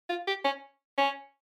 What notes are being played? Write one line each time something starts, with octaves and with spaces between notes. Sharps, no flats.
F4
G4
C#4
C#4